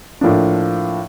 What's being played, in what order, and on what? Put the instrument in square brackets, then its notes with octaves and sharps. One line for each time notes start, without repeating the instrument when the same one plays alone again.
[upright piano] A2 F3 A#3 D4